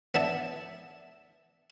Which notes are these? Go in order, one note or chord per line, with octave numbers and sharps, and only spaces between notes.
B3 D4 E5 A5